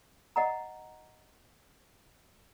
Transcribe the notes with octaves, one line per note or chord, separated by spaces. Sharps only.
D#5 F#5 A#5